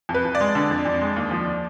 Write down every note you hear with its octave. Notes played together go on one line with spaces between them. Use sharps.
F2
B4
F2
D5
G#3
D3
F2
F2
G#3
D#2
F3